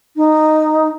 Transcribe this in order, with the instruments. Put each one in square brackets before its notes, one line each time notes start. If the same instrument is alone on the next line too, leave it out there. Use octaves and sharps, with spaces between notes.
[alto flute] D#4